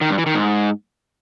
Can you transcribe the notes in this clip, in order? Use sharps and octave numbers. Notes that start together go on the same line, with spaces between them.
D#3
G2
E3
D#3
G#2